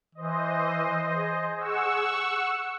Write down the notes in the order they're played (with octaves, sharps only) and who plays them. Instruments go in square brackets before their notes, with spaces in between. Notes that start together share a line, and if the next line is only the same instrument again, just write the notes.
[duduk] E3 [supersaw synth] C5 D#5
[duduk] G#4
[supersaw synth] F#5 C#6 E6